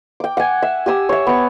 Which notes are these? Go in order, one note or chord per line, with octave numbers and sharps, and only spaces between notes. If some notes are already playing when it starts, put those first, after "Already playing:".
G5 D6
F#5 G#5
E5
G4 G#5 D#6 E6
C#5 E5
B3 C#6